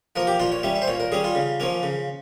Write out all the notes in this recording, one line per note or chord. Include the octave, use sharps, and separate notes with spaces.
F3 A#3 A#4
G4
A#2 F4
C#5
G3 C#4 E5
E5
C5
A#2 C#5
A#4
G3 C#4 G#4
F4
C#3
F3 A#3 C#4
C#3